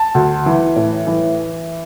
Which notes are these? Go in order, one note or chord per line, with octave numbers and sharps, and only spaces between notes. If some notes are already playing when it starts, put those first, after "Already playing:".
Already playing: A5
D2
E3
A2
E3